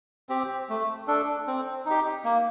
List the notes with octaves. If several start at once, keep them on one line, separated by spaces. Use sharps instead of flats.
C4 G4
A3
D4 A4
C4
D#4 G4
A#3